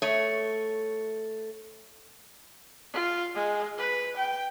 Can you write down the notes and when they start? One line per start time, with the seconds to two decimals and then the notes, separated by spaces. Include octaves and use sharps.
0.02 A3 C#5
2.93 F4
3.34 G#3
3.78 B4
4.17 G5